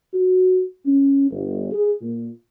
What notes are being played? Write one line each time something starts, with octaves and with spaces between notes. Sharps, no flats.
F#4
C#4
G1
G#4
A#2